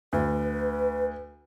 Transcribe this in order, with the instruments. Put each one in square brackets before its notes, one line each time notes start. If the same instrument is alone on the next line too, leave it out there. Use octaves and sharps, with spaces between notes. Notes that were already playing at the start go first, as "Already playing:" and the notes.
[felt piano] D2 [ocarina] B4